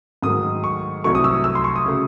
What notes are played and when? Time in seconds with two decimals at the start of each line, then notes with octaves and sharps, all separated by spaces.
0.22 G#2 D#3 F#3 A3 D#6
0.64 C#6
1.04 C2 C3 F#3 A3 C#6
1.15 D#6
1.24 E6
1.44 E6
1.55 C6
1.64 C#6
1.76 D#6
1.86 C#3 F#3 A3